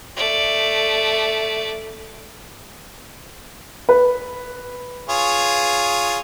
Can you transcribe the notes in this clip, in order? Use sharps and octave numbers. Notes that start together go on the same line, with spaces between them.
A3 D5
B4
F4 G#4 C#5